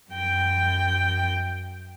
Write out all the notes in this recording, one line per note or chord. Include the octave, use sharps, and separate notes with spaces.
F#2 G5